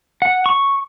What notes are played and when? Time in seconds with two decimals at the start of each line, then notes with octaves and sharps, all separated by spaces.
0.22 F#5
0.46 C#6